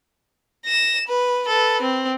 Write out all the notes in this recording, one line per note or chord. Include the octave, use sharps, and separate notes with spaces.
A#6 E7
B4
A4 B4
C4